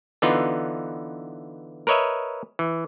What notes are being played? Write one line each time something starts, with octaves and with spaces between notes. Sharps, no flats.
D3 E3 B3 D#4 F4
A#4 B4 C#5 D#5 E5
E3